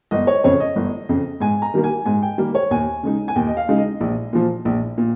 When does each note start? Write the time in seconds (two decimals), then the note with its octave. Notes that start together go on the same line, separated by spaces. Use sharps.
0.11 G1 D#5
0.27 C#5
0.44 F2 C#3 C#5
0.60 D#5
0.76 G1
1.09 F2 C#3
1.40 G#2 G#5
1.62 A#5
1.74 D#3 G3 A#3
1.84 G#5
2.06 G#2 G#5
2.22 G5
2.38 D#3 G3 A#3 A#4
2.55 C#5
2.71 D#2 G#5
3.03 C#3 G#3 D#4
3.28 G#5
3.35 D#2 G5
3.47 D#5
3.57 F5
3.68 C#3 G#3 D#4
3.78 D#5
4.01 A#1
4.33 A#2 F3
4.65 A#1
4.98 A#2